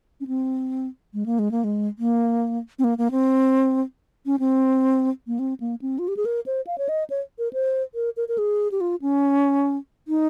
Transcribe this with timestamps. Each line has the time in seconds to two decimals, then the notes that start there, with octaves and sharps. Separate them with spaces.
0.21 C#4
0.27 C4
1.14 G#3
1.26 A#3
1.39 G#3
1.51 A#3
1.64 G#3
1.99 A#3
2.79 C4
2.84 A#3
2.98 A#3
3.12 C4
4.26 C#4
4.39 C4
5.27 A#3
5.39 C4
5.60 A#3
5.82 C4
5.99 F4
6.08 G4
6.17 G#4
6.25 A#4
6.46 C5
6.67 F5
6.78 C#5
6.89 D#5
7.10 C#5
7.39 A#4
7.53 C5
7.95 A#4
8.17 A#4
8.28 A#4
8.38 G#4
8.72 G4
8.81 F4
9.02 C#4
10.08 D#4